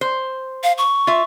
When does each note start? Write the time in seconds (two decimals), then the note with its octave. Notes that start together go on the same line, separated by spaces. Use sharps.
0.01 C5
0.63 F5
0.78 C#6
1.07 F4 E5